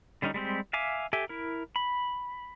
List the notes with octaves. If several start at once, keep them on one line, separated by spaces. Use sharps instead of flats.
D3 G3 C#4 D#4
G3 G#3 C4 G4
E5 F5 G#5 D6
G4 A4 E5 G#5
E4 A#4
B5